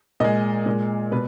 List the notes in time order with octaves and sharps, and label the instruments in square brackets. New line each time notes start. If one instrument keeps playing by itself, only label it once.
[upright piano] A#2 G#3 D#5
A#2 G#3
B2 B4